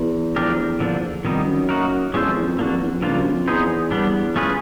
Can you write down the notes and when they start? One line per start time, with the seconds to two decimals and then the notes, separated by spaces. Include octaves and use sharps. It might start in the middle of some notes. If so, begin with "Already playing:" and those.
Already playing: E2
0.36 F3 A3 D4 G4 A#4
0.80 D3 F3 A#3 D4
1.25 F2 D#3 G3 B3 D#4
1.47 F#2
1.69 A#3 D#4 F#4 A#4
2.14 E2 G#3 C#4 F4 A4 C5
2.25 F2
2.36 E2
2.47 F2
2.59 E2 A#3 D4 F#4
2.69 F2
2.81 E2
2.92 F2
3.02 G2 C#3 F3 A#3 D4 F4
3.18 F#2
3.32 F2
3.47 E2 B3 D#4 G#4 C5
3.91 G3 B3 D4
4.36 A3 C#4 F4 G#4 B4